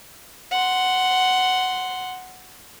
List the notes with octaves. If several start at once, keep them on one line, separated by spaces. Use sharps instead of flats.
F#5 C6